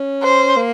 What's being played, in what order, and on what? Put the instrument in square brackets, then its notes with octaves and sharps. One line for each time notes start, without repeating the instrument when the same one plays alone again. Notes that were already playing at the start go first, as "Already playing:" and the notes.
Already playing: [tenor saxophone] C#4
[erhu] C5
[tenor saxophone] A#3